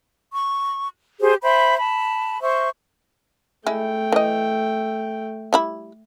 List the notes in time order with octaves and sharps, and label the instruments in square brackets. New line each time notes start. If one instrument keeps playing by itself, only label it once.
[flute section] C#6
G4 G#4 C5
C5 E5 G5 B5
A5 B5
C5 E5 C#6
[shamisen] G#3 E4 [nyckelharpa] A3 G5
[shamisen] E3 D#5
G3 E4 B5